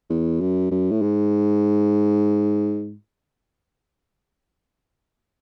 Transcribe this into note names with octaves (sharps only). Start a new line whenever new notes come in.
E2
F#2
F#2
A2
G#2